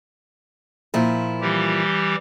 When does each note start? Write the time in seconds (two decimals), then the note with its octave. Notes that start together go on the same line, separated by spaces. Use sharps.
0.94 A#2 F3 E4
1.41 E3 G3 G4